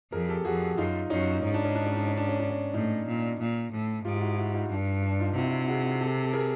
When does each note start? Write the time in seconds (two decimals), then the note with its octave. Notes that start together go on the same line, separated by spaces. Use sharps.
0.12 F2 G#4 A#4
0.29 G4 A4
0.45 F2 F#4 G#4
0.77 F#2 D#4 F4
1.10 F#2 C#4 D#4
1.43 G#2 C#4
1.54 D4
1.65 C#4
1.75 D4
1.86 C#4
1.96 D4
2.07 C#4
2.17 D4
2.29 C#4
2.40 D4
2.50 C#4
2.74 A2 C#4 D#4
3.06 A#2
3.39 A#2
3.72 A2
4.05 G#2 F4 G4
4.15 F4
4.20 E4 F#4
4.38 E4 F#4
4.54 D#4 F4
4.70 G2 D4
5.02 D4
5.19 D#4 F4
5.35 C3 E4 F#4
5.68 F#4 G#4
6.00 G4 A4
6.23 A4
6.33 G#4 A#4